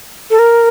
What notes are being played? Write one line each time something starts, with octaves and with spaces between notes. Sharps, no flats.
A4
A#4